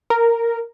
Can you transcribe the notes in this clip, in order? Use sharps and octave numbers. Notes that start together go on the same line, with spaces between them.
A#4